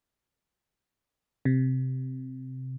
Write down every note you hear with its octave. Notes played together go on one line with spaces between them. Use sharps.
C3